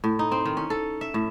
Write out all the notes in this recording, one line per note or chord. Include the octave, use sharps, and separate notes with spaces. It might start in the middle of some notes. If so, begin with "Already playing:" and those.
A2
D#4
C4
D#3
C#4
A4
E5
A2